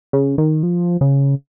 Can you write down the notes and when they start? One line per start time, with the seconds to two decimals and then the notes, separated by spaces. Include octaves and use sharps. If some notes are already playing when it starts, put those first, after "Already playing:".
0.13 C#3
0.38 D#3
0.63 F3
1.01 C#3